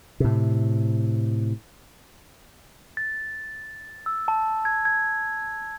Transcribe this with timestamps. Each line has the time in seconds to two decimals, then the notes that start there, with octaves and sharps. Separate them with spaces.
0.20 A2 C3
2.97 A6
4.06 E6
4.28 A5
4.65 G#6
4.85 G#6